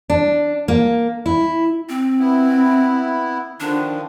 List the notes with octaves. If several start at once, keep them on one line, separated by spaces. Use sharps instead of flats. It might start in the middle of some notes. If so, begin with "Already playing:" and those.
D4
A#3
E4
C4
B3 E4
D3 D#3 F3 D4